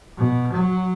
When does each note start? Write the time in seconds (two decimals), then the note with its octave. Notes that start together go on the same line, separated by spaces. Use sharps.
0.17 B2
0.52 F#3